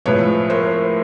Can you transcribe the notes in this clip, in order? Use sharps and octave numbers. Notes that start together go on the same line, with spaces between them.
A2 F3 G#3 B4 C#5
A#4 C5